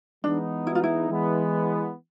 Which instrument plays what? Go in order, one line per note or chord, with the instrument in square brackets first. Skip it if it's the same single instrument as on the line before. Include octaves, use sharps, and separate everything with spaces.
[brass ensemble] E3 G#3 B3 D#4 [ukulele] D4
[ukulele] E4
F4
E4
[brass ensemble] E3 G#3 B3